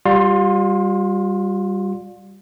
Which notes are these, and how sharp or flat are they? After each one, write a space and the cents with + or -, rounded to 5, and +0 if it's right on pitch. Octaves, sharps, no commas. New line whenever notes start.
G3 +0 F4 +35 C6 +5